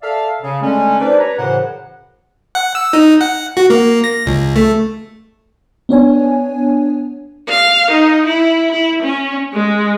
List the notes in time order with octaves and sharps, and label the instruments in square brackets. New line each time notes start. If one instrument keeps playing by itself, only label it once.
[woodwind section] A4 D5 E5 F5
C#3
D3 G#3 A3 C#4
D4 D#4 G4 B4 C5 D5
B4 C#5 A#5
F#2 A2 C#3 E3 C5 F#5
[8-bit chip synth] F#5
E6
D#4
F#5
F#4
A#3
A#6
C#2
A3
[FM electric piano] B3 D4 C#5 G#5
[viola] F5
D#4
E4
E4
C#4
G#3